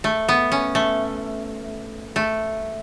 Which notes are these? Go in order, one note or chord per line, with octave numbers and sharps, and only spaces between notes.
A3
B3
C#4
A3
A3